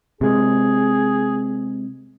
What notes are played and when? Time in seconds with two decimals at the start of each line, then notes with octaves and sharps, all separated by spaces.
0.21 C3 G#3 G#4